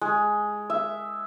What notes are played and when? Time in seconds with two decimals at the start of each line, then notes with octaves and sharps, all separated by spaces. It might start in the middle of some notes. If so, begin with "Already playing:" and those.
0.02 G#3
0.70 E5